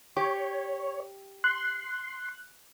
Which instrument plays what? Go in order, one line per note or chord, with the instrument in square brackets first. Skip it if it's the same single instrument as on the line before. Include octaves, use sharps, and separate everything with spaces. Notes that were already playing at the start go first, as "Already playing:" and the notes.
[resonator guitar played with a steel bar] G4 [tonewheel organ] C#5
[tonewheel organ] C6 [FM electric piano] F#6